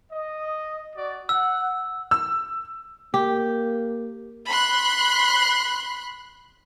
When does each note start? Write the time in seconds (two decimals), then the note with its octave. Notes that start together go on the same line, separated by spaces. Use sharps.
0.12 D#5
0.96 F#4 D5
1.29 F#5 E6
2.11 E6
3.14 A#3 G4
4.48 B5 C6 F#6